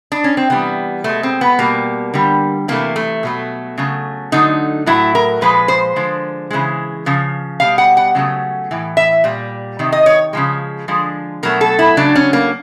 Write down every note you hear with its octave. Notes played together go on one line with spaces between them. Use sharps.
D4
C#4
C4
C3 E3 G3 B3
B2 G#3 A3
C4
B3
B2 G3 A#3
D3 G3
C3 E3 A3 A#3
A3
B2 F#3 A3
C#3 F#3 A3
D3 F#3 A3 D#4
A2 F#3 A3 E4
A#4
A#2 F3 G#3 B4
C5
D3 F3 G#3
C#3 E3 G#3
C#3 F3
B2 G3 F5
F#5
F#5
C#3 F#3 A3
A2 E3
E5
A#2 G3
C3 D#3
D#5
C#5
C#3 F3 G#3
D3 F3 G#3
B2 F#3 A3 A#4
A4
E4
C#3 F#3 A3 D4
C#4
A#3